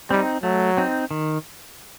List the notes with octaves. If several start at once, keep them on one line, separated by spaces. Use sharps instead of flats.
G3 C4 D#4
F#3 A3
C4 D#4
D#3